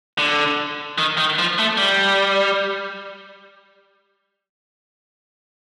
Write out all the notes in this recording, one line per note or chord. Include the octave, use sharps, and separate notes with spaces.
D3
D#3
D#3
F3
A3
G3